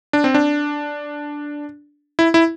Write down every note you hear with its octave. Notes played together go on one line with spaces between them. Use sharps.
D4
C4
D4
E4
E4